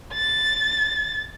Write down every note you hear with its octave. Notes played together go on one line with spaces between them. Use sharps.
A6